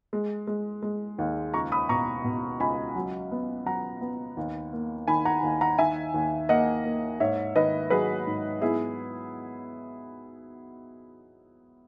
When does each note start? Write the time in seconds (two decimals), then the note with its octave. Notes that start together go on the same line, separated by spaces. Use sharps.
0.13 G#3
0.47 G#3
0.82 G#3
1.18 D#2
1.54 C#2 A#5 C#6
1.72 B5 D#6
1.89 B2 A#5 C#6
2.24 B2
2.60 C#2 G#5 B5
2.96 F#3
3.31 B3
3.66 F#3 F#5 A#5
4.01 B3
4.37 D#2
4.73 A#3
5.08 D#3 G#5 B5
5.25 F#5 A#5
5.43 D#2
5.61 F#5 A#5
5.78 D#3 E5 G#5
6.14 D#2
6.49 A#3 D#5 F#5
6.84 A#3
7.20 G#2 C#5 E5
7.55 D#3 B4 D#5
7.90 F#3 G#4 B4
8.27 G#2
8.62 B3 E4 G#4